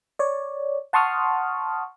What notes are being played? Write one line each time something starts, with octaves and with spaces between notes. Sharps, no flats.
C#5 D5
F#5 A5 C6 C#6 D#6 F6